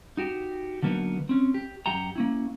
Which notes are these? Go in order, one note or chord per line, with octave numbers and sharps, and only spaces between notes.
D#4 F#4 G4
D3 F#3 A#3 B3 D#4
C4 C#4
G4
F#2 G4 F#5 G5 A#5
A#3 C#4 E4